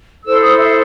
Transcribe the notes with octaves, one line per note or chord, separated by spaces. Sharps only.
E4 A4 C5 E6
D#6
E5